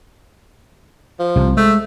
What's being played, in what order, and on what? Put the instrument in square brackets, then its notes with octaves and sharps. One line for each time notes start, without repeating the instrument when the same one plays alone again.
[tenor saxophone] F3
[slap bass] C2 C3
[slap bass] G#3 [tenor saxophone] A3